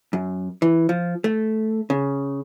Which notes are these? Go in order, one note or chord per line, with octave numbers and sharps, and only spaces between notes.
F#2
E3
F3
A3
C#3